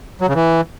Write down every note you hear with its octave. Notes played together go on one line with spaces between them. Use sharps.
F#3
C#3
E3